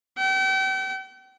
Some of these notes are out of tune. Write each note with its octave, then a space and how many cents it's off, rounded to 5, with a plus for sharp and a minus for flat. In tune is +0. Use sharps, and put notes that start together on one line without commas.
G5 -40